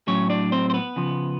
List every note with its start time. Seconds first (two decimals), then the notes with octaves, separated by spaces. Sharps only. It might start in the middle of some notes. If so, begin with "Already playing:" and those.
0.07 A2 F#3 C#4 C#5
0.29 D4 D5
0.52 C4 C5
0.70 C5
0.74 B3 B4
0.96 C#3 F3